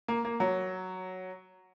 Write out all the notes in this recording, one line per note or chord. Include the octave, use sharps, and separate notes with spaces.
A#3
A#3
F#3